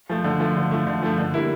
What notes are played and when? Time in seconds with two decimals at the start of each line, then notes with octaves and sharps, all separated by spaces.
0.09 F3 A3
0.24 D3
0.40 F3 A3
0.56 D3
0.71 F3 A3
0.87 D3
1.02 F3 A3
1.18 D3
1.34 G3 A#3 E4